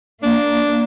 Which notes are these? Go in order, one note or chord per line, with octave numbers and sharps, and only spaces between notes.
A#3 D4